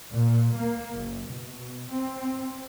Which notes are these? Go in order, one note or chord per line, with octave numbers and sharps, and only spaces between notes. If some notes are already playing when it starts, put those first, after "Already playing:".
A#2
A#3
F#1
B2
C4